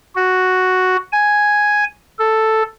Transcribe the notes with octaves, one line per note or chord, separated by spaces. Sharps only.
F#4
G#5
A4